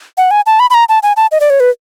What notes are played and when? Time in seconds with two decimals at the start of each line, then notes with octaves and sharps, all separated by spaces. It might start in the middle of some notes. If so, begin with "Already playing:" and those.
0.18 F#5
0.31 G#5
0.46 A5
0.60 B5
0.70 B5
0.74 A#5
0.89 A5
1.03 G#5
1.17 A5
1.32 D#5
1.41 D5
1.50 C#5
1.60 B4